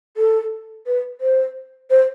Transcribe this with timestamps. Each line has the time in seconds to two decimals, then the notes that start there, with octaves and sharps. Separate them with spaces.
0.17 A4
0.87 B4
1.21 C5
1.90 C5